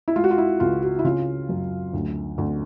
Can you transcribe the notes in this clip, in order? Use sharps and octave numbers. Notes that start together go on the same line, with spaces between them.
E4
G#3 F4
F#4
F4
E4
C#2 F4
F#4
E4
C#3 F4
F#2
D2
D2